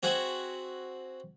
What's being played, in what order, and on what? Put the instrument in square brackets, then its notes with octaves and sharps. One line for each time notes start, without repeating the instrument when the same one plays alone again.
[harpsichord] C4 F#4 G#4 E5 F#5 G#5